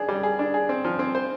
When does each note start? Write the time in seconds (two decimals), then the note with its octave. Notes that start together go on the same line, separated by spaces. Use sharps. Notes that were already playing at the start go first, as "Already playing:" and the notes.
Already playing: D4 G#4
0.08 G3
0.23 G#4
0.39 D4
0.54 G#4
0.69 C4
0.84 F3
0.99 C4
1.15 C5